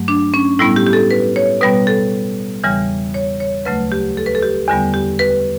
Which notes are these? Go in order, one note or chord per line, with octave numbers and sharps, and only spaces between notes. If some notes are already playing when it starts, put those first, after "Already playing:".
Already playing: G2 F#3 A3
D4
C#4
A2 G3 B3 E4
G4
G4
A4
B4
C#5
B2 G3 B3 B4
A4
E2 C#3 E3 G3
C#5
C#5
D2 C#3 F#3 A3 B4
G4
A4
B4
A4
G4
E2 D3 G3 B3
G4
B4